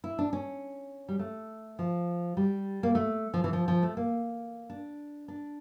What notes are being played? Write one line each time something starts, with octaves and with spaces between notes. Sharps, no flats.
E4
D4
C#4
G3
A3
F3
G3
A#3
A3
F3
E3
F3
F3
A3
A#3
D4
D4